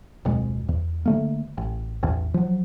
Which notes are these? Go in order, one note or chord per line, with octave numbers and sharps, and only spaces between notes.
D1 F2 B2 G#3
E2
D3 A3 A#3
A1
A1 E2
F3 F#3